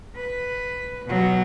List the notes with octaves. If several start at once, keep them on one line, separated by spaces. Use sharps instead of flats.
B4
B2 F#3